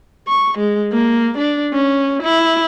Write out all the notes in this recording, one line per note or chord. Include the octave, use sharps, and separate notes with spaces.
C#6
G#3
A#3
D4
C#4
E4